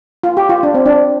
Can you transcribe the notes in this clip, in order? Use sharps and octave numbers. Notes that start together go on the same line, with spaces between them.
F4
G4
F4
D4
C4
D4